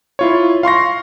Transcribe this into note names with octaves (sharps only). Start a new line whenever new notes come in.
E4 F4 C#5
F5 C6 C#6 A#6